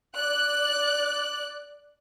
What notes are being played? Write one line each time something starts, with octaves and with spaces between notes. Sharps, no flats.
D5 F#6